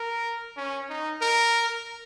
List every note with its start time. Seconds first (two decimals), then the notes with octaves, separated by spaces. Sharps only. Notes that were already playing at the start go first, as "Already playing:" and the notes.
Already playing: A#4
0.57 C#4
0.90 D#4
1.21 A#4